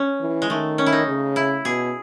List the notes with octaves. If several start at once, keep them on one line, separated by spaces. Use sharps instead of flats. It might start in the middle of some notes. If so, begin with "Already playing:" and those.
Already playing: C#4
E3
G#3
D#3 A3
C#4
E4
D#4
C#3
E4
B2 G#4